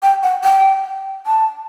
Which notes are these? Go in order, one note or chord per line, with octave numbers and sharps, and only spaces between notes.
G5
F#5
G5
A5